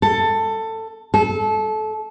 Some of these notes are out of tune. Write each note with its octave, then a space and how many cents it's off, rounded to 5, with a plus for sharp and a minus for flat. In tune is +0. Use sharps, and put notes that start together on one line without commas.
A4 +15
A4 -25